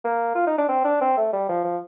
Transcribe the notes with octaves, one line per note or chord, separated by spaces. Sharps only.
A#3
F4
D#4
D4
C4
D4
C4
A3
G3
F3
F3